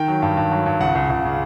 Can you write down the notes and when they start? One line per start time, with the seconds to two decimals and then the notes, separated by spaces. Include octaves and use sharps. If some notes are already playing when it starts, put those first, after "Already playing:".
Already playing: D#3 G5
0.08 F#3
0.22 G2
0.37 G2
0.52 F#3
0.66 G2
0.81 C#2 F#5
0.95 C#2
1.10 C#2
1.25 C#3